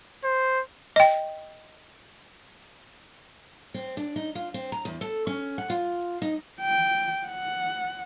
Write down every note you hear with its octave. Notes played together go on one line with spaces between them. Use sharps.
C5
D#5 G5
C4
D4
D#4
F4
C4
A#5
E2
A4
C#4
F#5
F4
D#4
G5
F#5